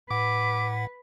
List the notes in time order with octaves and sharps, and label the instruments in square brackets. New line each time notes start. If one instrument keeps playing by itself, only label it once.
[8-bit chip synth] A2 F#5 [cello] B4 [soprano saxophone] D6